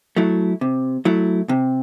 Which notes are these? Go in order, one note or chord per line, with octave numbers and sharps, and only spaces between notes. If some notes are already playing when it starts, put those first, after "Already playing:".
F#3 A3 E4
C3
F#3 A3 E4
C3